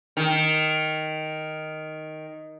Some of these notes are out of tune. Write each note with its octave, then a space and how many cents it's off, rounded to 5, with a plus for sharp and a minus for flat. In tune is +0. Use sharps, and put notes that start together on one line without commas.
D#3 +0